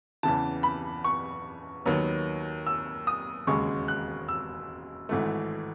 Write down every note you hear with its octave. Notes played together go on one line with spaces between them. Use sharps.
E2 C#3 E3 A5
B5
C#6
D#2 D#3 F#3 B3
E6
D#6
E1 D#2 C#3 G#3 C#6
F#6
E6
G#1 G#2 E3 A3